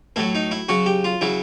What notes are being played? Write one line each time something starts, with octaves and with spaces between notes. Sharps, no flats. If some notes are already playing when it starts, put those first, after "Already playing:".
A2 F#3 E4
D#4
E4
C#3 F#3 F#4
G4
F4
C#3 F#3 E4